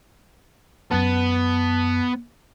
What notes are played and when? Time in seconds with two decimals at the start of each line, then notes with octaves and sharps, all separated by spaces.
0.91 F#2 B3 A5